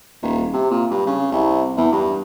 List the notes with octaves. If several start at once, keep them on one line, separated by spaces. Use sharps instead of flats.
D#1
C3
A#2
G2
C#3
C2
E2
G2